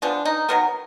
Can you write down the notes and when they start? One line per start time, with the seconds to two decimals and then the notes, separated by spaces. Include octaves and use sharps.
0.02 F3 G#3 B3 D4
0.25 D#4
0.49 D#3 F#3 B3 A#4